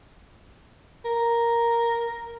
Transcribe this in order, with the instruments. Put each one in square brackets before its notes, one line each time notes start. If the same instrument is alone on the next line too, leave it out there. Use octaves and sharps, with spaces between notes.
[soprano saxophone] A#4